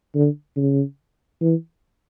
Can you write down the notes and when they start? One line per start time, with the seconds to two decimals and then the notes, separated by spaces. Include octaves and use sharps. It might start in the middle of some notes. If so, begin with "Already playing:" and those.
0.15 D3
0.57 C#3
1.41 E3